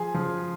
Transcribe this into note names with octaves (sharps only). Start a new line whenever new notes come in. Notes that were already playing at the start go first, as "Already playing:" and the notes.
Already playing: F3 G#4
F3